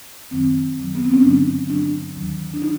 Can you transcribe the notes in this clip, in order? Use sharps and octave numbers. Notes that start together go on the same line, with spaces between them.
F#2 D#3 F#3 C4
F#2 D#3 F#3
B3
C4
C#4
G2 D3 F#3 D4
G2 D3 F#3 D4
D#2 D#3 F#3
D4
D#3 D#4